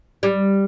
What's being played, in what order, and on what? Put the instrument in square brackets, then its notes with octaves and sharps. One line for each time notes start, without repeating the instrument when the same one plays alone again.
[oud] G3